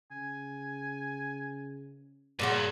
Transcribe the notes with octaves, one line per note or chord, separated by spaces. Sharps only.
C#3 G#5
G2 A#2 C#3 F#3 A4